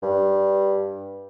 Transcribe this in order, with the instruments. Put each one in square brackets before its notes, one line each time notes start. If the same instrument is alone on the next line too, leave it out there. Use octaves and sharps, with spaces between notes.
[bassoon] G2